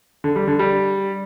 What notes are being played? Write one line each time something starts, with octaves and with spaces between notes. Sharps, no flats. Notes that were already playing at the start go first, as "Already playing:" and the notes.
D3
G3
D3
G3